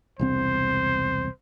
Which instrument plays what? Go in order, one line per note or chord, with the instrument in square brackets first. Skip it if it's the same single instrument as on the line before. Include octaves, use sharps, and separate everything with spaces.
[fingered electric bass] E1 C2 C4 [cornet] C5